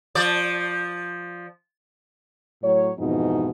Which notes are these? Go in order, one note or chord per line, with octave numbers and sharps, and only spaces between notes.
F3 D5
A2 F#3 C#5
F2 G#2 B2 E3 D#4